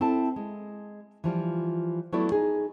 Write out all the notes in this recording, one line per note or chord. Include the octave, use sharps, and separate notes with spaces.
C4 E4 A4 A5
G#3
E3 F3 G3 F4
F#3 A3 B3 E4 D5
D#4 G#4